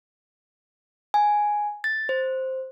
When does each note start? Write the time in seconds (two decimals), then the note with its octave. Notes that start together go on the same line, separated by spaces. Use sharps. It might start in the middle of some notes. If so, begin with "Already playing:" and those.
1.14 G#5
1.84 A6
2.09 C5